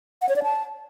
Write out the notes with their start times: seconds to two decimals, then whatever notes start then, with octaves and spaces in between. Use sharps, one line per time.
0.22 F#5
0.29 C#5
0.36 D5
0.43 A5